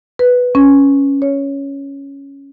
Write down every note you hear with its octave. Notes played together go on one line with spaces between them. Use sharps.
B4
C#4
C#5